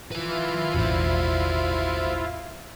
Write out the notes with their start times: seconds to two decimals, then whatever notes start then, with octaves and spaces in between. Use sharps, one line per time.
0.12 E4 F4 B4 G#5
0.74 E1 A1 F#4 C5